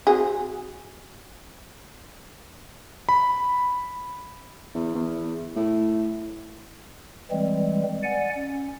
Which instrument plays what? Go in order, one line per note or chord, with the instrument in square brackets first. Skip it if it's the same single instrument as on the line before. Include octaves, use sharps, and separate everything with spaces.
[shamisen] C4 F#4 G#4
[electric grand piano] B5
[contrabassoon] E2
E2
A2
[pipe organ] E3 G3 G#3 C4
D5 F#5 G#5
C#4